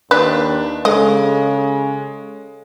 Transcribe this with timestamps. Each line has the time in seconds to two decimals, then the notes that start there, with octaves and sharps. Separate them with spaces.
0.11 D#2 D4 B4
0.85 C#3 G#3 A4 D#5